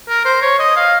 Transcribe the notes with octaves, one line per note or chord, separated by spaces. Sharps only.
A#4
C5
C#5
D#5
F5